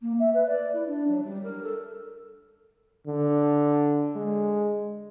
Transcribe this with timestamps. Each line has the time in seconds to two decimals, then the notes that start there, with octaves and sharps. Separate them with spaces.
0.01 A#3
0.19 E5
0.34 B4
0.47 D5
0.73 E4
0.87 D4
1.08 F#3
1.23 G3
1.43 A#4
1.63 A4
3.07 D3
4.16 G#3